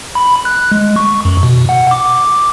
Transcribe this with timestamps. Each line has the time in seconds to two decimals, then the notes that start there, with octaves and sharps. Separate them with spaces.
0.15 B5
0.45 F#6
0.72 G#3
0.96 C#6
1.25 F#2
1.43 B2
1.69 F#5
1.91 D6